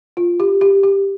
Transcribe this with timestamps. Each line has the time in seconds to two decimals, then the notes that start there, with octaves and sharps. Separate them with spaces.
0.17 F4
0.40 G4
0.61 G4
0.83 G4